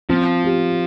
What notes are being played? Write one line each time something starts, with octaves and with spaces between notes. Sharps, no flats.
F3 C4
G4